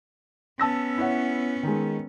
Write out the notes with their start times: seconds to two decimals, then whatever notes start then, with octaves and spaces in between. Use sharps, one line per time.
0.59 B3 C#4 A5 E6 A#6
0.98 E4 C#5 F#5
1.63 D#3 G#3